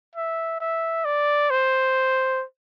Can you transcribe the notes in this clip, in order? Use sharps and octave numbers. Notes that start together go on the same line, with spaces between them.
E5
E5
D5
C5